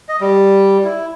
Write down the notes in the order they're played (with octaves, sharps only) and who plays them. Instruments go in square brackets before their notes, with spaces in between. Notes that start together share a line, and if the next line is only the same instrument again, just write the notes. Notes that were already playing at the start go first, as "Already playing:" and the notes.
[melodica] D#5
G3
E4